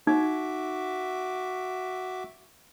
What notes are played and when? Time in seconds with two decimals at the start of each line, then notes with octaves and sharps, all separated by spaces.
0.07 D#4 F#4 E5 D6